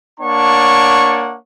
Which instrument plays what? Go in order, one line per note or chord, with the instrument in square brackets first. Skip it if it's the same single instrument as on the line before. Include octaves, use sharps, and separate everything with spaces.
[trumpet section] A#3 D4 C#5 F#5 A5 C#6